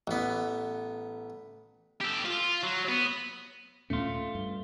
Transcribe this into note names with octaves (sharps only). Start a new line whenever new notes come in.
A1 B3
G4 A4
F4
F#3
B3
D#2 A#2 A3 C#4 F4
G2